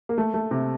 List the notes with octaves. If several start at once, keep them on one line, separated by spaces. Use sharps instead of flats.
A#3
A3
A3
C3